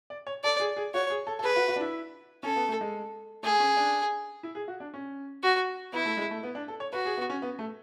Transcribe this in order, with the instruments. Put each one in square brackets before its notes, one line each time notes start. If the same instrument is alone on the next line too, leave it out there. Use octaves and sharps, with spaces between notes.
[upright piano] D5
C#5
[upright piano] A4 [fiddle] D5
[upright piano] G#4
G#4
[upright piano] F#4 [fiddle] C#5
[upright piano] G#4
A4
A4
[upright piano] G#4 [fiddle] B4
[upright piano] F#4
F#4
D4
E4
[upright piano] C#4 [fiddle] A4
[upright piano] B3
A3
G#3
[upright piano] A3 [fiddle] G#4
[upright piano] C#4
D4
E4
G#4
F#4
D4
C#4
[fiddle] F#4
[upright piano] B3 [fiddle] E4
[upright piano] A3
G#3
A3
B3
D4
A4
C#5
[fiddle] F#4 [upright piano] B4
[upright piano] G#4
B3
C#4
B3
A3